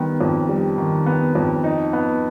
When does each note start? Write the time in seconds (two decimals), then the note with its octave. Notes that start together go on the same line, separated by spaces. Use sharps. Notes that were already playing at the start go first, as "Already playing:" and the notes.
Already playing: D#3 G3 B3
0.21 F2
0.49 G3
0.78 D#3
1.06 B3
1.35 F2
1.64 D#4
1.93 B3